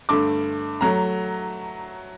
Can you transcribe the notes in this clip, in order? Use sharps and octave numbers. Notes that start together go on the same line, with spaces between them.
G2 D3 A3 D6
F#3 A3 A#5